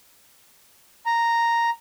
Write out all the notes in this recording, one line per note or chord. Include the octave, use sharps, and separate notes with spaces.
A#5